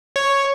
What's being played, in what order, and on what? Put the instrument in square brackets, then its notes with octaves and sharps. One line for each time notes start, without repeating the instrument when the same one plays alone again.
[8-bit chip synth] C#5